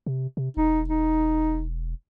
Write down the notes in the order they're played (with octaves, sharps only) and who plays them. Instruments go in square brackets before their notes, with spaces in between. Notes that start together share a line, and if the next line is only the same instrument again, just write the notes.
[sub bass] C3
C3
[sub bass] E1 [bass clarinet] D#4
[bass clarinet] D#4